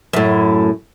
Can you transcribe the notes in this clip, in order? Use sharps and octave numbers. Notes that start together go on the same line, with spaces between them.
F#2 A2